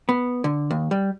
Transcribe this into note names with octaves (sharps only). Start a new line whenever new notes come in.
B3
D3
D#2
G3